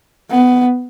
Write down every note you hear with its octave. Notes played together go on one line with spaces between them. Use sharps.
B3